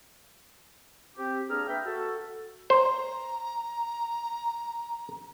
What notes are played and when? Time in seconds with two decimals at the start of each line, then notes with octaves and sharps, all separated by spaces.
1.17 C4 G4
1.49 E2 A#3 D4 G#4 A#5 F6
1.67 B4 E5 G5
1.84 F#4 A4
2.70 C5 A#5